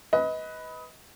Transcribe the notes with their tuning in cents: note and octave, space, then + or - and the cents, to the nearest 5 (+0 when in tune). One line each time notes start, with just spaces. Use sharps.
B4 +0 D#5 +25